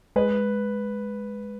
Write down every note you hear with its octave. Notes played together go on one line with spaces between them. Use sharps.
G#3 B4